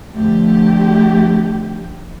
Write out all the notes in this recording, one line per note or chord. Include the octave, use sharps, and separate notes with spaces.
F2 D3 A3 G4